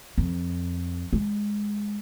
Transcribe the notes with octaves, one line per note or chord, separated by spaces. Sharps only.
F2
G#3